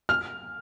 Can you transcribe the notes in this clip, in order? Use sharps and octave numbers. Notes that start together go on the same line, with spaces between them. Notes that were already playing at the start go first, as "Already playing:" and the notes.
F6